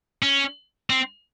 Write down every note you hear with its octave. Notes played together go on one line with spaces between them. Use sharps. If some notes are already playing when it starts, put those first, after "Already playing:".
C#4
C4